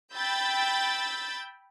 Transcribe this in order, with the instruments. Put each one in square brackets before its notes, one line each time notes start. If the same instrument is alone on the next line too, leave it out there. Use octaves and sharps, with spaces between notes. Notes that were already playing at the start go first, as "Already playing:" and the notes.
[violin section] G5 B5 E6 G6 A6